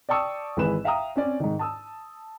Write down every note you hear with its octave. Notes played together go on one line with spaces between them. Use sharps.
D5 G5 A5 C#6 D#6 E6
G#1 E3 G#3 G#4 B4 E7
E5 F5 G5 A#5 D#6
C4 C#4 D5
G#2 D#3
A5 D#6 E6